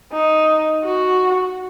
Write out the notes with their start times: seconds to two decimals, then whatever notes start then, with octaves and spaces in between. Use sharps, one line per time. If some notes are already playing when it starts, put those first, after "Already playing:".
0.12 D#4
0.84 F#4